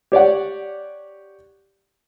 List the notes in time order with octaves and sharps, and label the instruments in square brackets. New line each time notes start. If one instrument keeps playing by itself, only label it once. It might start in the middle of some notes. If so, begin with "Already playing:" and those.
[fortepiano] G4 C#5 D5 F#5